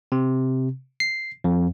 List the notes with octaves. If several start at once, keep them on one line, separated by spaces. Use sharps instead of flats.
C3
C7
F2